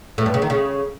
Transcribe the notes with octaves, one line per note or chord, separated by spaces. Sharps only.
A2
G2
C#3
D#3
C#3